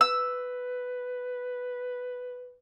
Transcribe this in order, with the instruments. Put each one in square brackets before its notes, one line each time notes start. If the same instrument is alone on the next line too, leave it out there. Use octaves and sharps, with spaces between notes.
[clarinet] B4 [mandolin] E6